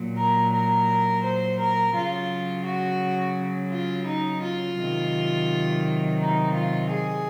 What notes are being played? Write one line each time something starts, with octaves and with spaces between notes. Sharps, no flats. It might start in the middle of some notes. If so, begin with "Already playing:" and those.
Already playing: A#2 F#3
A#4
A#4
C5
A#4
C#3 F#3 F4
F#4
F4
D#4
F4
C3 D#3 F#3
D#4
F4
G#4